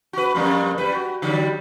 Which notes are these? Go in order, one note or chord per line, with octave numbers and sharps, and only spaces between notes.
F#4 B4
F2 G3 A#3
G3 B4
F#4
D3 F#3 G3